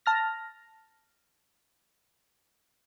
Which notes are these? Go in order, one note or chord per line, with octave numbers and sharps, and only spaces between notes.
A5 F6 A#6